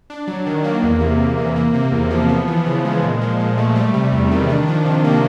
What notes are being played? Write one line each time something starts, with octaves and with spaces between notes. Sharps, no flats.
D4
F#3
D#3
A#3
E2
C3
E2
E3
A#3
C3
E2
F3
B3
E3
C#3
G#3
A#2
F3
A#2
A3
G3
C3
E2
D#3
D4
F3
C3
A#3